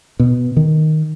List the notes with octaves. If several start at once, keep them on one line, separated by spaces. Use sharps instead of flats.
B2
D#3